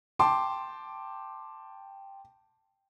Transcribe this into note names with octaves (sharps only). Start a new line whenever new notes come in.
G5 A5 C6 D6